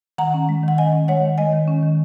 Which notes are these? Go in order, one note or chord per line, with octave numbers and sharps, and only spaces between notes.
D#3 F#5 A#5
C#4
G#3
D#3 F#5
C#4 D#5 G#5
C#4
G#3 C#5 F#5
D#3
G#3 D#5 G#5
D#3
C#4
D#3